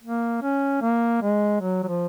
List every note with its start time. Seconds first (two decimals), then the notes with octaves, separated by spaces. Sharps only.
0.03 A#3
0.42 C#4
0.81 A#3
1.22 G#3
1.61 F#3
1.83 F#3
1.88 F3